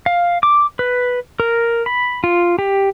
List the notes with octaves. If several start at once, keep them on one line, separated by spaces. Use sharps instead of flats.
F5
D6
B4
A#4
B5
F4
G4